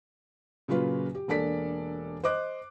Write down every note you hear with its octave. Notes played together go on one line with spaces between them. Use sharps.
A#2 C#3 F#3 F4 B4
G4
E1 A#3 D4 A4 D5 B6
C5 D#5 D6 F#6